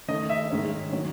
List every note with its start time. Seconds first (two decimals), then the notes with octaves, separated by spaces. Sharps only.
0.08 D#3 A3 C#4 D#5
0.30 E5
0.50 G#2 D#3 G#3 C#4
0.93 D#3 F#3 C#4